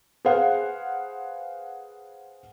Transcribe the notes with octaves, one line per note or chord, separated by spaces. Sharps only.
G#4 B4 C5 F5 F#5